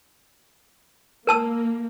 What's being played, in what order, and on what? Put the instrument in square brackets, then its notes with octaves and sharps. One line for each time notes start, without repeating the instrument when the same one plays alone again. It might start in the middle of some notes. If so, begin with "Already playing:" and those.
[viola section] A#3 [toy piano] A#4 A5 E6